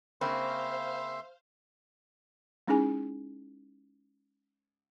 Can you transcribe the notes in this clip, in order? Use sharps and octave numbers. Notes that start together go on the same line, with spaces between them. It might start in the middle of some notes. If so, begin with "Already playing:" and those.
C#3 A#3 C4 C5 E5 F5 B5 C6
G#3 C#4 D#4 E4 G#4 G#5